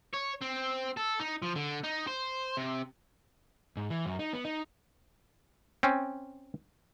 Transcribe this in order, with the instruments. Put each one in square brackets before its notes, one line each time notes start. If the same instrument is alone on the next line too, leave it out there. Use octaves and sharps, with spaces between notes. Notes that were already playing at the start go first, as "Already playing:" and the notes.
[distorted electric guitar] C#5
C4
A4
D#4
F3
D3
D#4
C5
C3
[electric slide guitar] G#2
E3
F#2
D#4
B3
D#4
[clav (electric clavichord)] C4 C#4